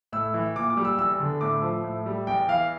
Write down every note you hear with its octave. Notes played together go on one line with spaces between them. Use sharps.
A2 E6
E3
A#2 D6
D6
G3
E6
E2 E6
D3
A2 D6
F3
A2
G3
E2 G5
E3 F5